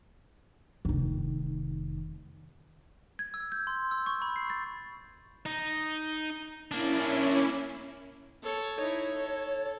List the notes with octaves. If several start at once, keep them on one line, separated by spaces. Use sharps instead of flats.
F1 D#3
G#6
E6
G6
C6
E6
C#6
B5
C7
A6
D#4
A#3 C#4 D4 E4
A4 C#5
D#4 E4 C#5
A4